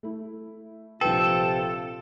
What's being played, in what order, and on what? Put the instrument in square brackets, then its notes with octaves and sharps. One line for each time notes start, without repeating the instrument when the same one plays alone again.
[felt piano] A3 E4
[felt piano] A#1 B4 [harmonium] C3 F4 [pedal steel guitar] A4 [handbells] G5